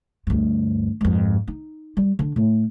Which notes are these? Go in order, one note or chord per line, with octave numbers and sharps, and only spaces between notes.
D2 G2
F2 G#2
D#4
G3
D3
A2